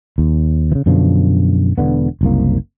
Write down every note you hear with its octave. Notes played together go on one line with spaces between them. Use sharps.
D#2
C#3 E3
F#2 B2 D3 F3
E1 D3 B3
F#1 C2 A#3